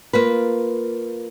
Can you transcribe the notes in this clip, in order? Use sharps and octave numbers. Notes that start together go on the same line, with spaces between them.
A#3 F4 B4